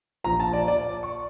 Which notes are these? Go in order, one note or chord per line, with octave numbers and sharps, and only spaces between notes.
A#1 A#2 F3 A#5
A5
D5
D5
C#6